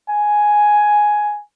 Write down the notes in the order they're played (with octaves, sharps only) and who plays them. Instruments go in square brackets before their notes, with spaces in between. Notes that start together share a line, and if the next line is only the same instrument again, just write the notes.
[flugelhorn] G#5